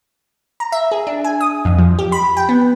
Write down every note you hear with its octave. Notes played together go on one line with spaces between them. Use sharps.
A#5
E5
G#4
D4
G#5
D#6
F2
F3
G4
B5
G5
B3